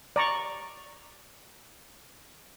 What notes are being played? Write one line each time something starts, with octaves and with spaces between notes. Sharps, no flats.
D5 A#5 C#6